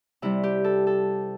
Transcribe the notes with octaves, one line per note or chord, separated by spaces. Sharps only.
C3 G3 E4
G4
A4
A4